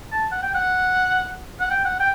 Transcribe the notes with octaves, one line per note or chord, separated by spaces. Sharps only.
A5
F#5
G5
F#5
F#5
G5
F#5
G5